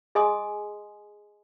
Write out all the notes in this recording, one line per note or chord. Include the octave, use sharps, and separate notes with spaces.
G#4 D#5 G#5 C6 D#6